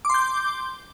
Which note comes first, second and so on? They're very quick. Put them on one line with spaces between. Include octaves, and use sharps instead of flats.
D6 C6 G6